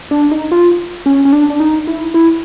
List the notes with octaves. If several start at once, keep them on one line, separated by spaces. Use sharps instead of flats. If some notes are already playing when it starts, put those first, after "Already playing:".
D4
D#4
F4
C#4
C#4
D4
D4
D#4
E4
E4